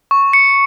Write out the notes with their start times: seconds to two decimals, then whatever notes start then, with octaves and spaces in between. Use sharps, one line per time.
0.11 C#6
0.33 C#7